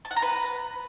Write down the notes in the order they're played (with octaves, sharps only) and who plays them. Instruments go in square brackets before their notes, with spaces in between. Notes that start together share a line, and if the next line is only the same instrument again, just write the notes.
[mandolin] A5
F#5
A#5
B4